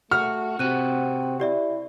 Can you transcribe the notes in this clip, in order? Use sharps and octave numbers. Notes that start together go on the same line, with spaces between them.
A3 F#4 F6
C3 C4 F#4 F#6 D#7
E4 G4 D5 E5